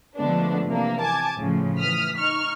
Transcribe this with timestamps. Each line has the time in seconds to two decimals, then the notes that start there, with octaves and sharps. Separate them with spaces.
0.17 D3 F3 G#3 A3 B3 D4
0.67 C3 E3 A#3 D4
1.01 G#5 A5 D6 G#6
1.38 A2 C#3 F3
1.78 E3 D#6 F6 B6
2.17 D#4 C#6 F6